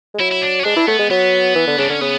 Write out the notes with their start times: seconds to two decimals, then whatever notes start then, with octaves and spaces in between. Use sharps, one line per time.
0.14 G#3
0.19 F#3 E4
0.31 E4
0.42 D4
0.59 C#4
0.65 G#3 D4
0.76 E4
0.87 A3 B3
0.98 G#3
1.10 F#3 B3
1.55 E3
1.67 D3
1.78 C#3 D4
1.89 D3 C#4
2.01 C#3 B3